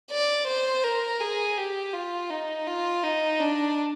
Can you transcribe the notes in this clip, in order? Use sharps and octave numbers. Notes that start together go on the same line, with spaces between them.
D5
C5
A#4
G#4
G4
F4
D#4
F4
D#4
D4